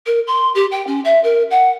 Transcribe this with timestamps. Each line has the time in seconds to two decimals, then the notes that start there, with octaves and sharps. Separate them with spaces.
0.06 A#4
0.27 C6
0.55 G4
0.71 G5
0.87 C#4
1.04 E5
1.23 A#4
1.50 F#5